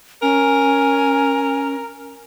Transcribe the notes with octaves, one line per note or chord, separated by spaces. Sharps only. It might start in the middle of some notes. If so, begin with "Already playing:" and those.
C#4 A#4 G#5